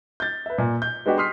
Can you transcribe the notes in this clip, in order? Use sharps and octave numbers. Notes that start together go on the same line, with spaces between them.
G6 A6
B4 E5
A#2
G6
G#3 B3 D4 F#4 G4
C6 D#6 F6 B6 C7